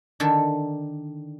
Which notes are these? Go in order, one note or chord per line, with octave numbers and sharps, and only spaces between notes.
D3 D#3 A4